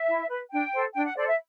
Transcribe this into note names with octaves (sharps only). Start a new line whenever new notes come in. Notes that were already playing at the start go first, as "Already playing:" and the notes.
Already playing: E5
E4
B4
D4 G5
A4 C5
D4 G5
F#5
A4 C5 D5
E5